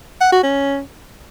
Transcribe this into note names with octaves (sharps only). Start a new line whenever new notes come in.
F#5
F#4
C#4